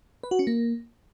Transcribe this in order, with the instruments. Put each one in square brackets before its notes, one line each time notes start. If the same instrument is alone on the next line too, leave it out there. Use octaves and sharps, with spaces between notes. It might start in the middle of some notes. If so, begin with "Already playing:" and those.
[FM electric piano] B4
F#4
C#4
A#3